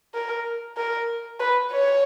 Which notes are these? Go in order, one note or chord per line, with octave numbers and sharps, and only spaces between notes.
A#4
A#4
B4
C#5